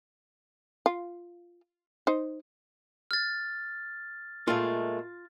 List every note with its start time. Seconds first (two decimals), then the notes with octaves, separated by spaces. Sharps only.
0.86 F4
2.07 D#4 C5
3.11 F6 A6
4.48 A#2 G#3 A3 F4